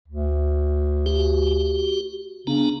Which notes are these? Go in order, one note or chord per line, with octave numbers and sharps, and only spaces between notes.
D2
F#4 G4
C#3 B3 D4 A#5